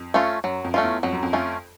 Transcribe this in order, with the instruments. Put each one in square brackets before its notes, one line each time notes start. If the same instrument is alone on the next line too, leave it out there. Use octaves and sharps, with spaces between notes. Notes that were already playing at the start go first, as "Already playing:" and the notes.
Already playing: [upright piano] F2
[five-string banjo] A3 C#4 F4
[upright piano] F#2 [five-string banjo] F#3
[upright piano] F2
[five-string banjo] A3 C#4 F4
[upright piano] E2
[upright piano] F2 [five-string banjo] F#3
[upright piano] F#2
F2
[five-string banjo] A3 C#4 F4